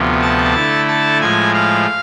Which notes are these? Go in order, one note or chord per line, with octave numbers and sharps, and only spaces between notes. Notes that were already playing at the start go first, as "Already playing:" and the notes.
Already playing: D2 C3 F3 B3
A5 A6
D3 A3 E4
A5 A6
A2 F3 G#3 G#5 G#6
F5 F6